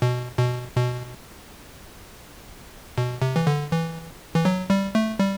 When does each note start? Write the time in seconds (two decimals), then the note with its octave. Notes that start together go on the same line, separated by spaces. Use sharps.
0.02 B2
0.38 B2
0.76 B2
2.98 B2
3.22 C3
3.36 E3
3.47 D3
3.71 E3
4.35 E3
4.45 F#3
4.70 G3
4.95 A3
5.19 G3